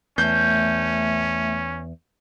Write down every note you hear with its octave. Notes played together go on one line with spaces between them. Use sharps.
E2 A3 C#4 E5 G6